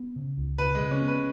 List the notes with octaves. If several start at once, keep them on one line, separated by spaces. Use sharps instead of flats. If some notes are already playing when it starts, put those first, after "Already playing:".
Already playing: B3
C#3
C#2
C#3 B4
G#3
C#3
C#4
B3
B4